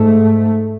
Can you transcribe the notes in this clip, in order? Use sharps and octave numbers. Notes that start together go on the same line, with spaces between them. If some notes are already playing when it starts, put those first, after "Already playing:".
Already playing: G#2 A3